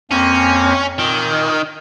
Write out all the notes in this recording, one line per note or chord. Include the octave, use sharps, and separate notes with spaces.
F2 A#3 C4 C#4
A#2 D#3